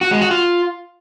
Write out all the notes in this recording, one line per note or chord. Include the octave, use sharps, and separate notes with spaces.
F#4
G#3
F#4
F4